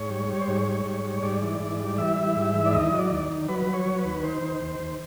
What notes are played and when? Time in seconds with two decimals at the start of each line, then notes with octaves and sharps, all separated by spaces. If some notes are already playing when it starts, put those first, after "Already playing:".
Already playing: G#2 C#5
0.10 G3
0.29 G3
0.41 C5
0.48 G#2 C#5
0.66 G3
0.85 G#2
1.05 G3
1.23 G#2 D5
1.42 E3
1.60 G#2
1.79 G3
1.98 E3 E5
2.16 G3
2.36 G#2
2.54 E3
2.65 D5
2.73 D#2 D#5
2.92 F#3
2.98 D5
3.11 D#2
3.30 D#3
3.49 F#3 B4
3.66 F#3
3.73 C#5
3.85 F#3
3.98 B4
4.05 D#2
4.23 D#3 C5
4.42 D#3
4.62 D#2
4.80 D#2